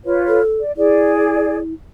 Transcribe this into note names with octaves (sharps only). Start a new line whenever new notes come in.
F4 B4 C#5
A4
D5
E4 G#4 D5